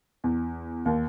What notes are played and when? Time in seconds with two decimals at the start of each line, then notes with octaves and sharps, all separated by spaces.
0.24 E2
0.86 D#2